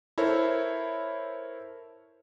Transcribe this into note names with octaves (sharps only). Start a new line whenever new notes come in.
E4 A4 A#4 C5 C#5 E5